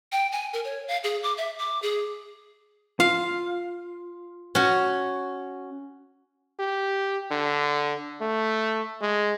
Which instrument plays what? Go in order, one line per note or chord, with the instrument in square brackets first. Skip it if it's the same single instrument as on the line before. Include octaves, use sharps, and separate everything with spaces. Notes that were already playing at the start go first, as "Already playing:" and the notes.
[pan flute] G5
G#5
A#4
C#5
F5
G#4
D6
E5
D6
G#4
[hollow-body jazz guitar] F4 [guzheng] F5
[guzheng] C#4 F#4
[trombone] G4
D3
A3
G#3